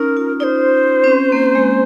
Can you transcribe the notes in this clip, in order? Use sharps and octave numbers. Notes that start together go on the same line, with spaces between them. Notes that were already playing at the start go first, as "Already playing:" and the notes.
Already playing: C#4 D#4 A#4
F4
D#4 C5 D5
C4
C#4
A#3
G#3